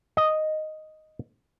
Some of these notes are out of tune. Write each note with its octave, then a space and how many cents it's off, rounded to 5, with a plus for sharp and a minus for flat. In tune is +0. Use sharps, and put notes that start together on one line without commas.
D#5 +0